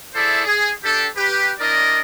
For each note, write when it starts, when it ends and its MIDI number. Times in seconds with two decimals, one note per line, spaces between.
0.14 0.44 64
0.14 0.44 68
0.14 0.44 69
0.14 0.44 72
0.14 0.44 74
0.14 0.44 76
0.46 0.71 68
0.84 1.07 62
0.84 1.07 67
0.84 1.07 69
1.16 1.51 67
1.16 1.51 71
1.59 2.00 62
1.59 2.00 64
1.59 2.00 70
1.59 2.00 74
1.59 2.00 75